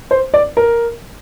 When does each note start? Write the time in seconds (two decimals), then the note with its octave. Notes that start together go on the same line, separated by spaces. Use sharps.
0.11 C5
0.34 D5
0.57 A#4